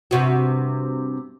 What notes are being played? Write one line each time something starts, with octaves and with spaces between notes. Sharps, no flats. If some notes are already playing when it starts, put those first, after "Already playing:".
G2 C3 F#4